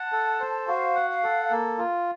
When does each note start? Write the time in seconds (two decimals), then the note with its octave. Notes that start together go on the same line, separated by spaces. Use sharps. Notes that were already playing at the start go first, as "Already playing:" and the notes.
Already playing: F#5 A5
0.12 A4
0.40 C5
0.67 F#4 F5
0.95 F#5
1.09 F5
1.23 A4
1.51 A#3
1.78 F4